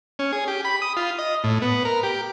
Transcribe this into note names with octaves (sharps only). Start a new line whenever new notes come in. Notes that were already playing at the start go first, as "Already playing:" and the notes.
C#4
G#4
G4
B5
D#6
F4
D#5
A2
B3
A#4
G4